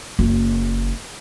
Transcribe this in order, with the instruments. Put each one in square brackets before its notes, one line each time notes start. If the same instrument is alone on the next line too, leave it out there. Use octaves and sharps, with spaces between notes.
[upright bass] F#1